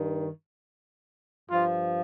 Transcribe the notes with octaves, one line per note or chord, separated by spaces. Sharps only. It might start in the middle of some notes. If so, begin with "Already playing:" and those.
Already playing: G2 D#3
G2 F3 F4